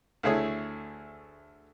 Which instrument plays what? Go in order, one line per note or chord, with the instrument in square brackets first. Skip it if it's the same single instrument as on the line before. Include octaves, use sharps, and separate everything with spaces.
[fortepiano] D2 A3 E4 G#4 C#5